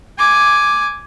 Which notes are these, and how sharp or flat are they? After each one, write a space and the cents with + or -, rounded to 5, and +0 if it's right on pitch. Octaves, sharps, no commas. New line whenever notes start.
G#5 +0 D6 +0